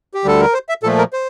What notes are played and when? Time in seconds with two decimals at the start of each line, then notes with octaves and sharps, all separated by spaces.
0.14 G4
0.25 D2 D3 G3 A4
0.41 A#4
0.54 C5
0.69 E5
0.83 A#2 F3 A3 A4
0.98 A#4
1.13 C5